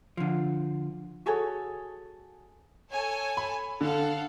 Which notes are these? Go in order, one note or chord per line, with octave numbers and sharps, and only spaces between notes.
D3 F3
F#4 G#4 A4 C#5
A4 C#5 G#5
B5
D3 A4 F5 F#5